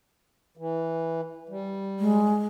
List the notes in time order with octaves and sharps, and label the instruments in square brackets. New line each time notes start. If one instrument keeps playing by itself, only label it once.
[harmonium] E3
G3
[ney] G#3